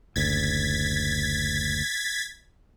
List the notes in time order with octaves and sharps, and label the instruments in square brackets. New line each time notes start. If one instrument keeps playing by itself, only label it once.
[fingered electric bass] F#1 D2 [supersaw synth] G#6 A6 B6